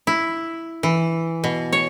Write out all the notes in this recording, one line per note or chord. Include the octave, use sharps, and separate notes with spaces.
E4
E3
B2
C#5